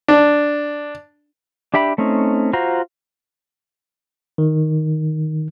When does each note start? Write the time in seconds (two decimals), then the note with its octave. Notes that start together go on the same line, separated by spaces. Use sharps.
0.08 D4
1.74 D4 G4 E5 G5 B5
1.98 A3 C4 C#4 D#4
2.53 F4 F#4 C5 A#5
4.38 D#3